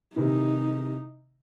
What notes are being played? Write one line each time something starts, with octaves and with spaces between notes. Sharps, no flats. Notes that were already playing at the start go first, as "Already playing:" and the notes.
C3 D#3 E3 D#4